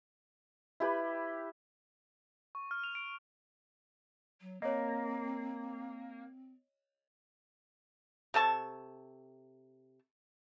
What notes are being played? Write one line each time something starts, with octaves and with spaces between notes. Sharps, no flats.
E4 G4 B4 B5
C#6
F6
F7
D7
F#3
A#3 C4 C#5 D#5
C3 A4 A5 C#6